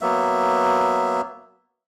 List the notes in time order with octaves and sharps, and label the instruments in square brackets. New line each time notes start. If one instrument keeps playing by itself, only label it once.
[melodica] F#3 A#3 B3 E5